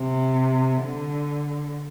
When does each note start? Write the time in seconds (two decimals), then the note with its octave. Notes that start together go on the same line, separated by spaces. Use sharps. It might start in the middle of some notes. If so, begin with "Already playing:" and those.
Already playing: C3
0.83 D3